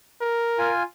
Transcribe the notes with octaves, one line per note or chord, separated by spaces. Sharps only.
A#4
F4 G#5